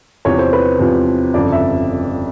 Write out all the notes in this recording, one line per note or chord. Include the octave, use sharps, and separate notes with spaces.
E2 C3 F3 C#5
C5
B4
E2 C3 F3
G1 F2 C#3 D5
E5